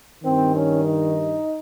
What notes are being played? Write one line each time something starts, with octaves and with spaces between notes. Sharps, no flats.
G2 D#3 C4
C#4
D#4